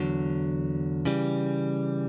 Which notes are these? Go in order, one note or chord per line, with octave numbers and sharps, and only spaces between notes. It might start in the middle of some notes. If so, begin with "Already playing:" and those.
Already playing: E2 D3 F#3
C#3 E3 G3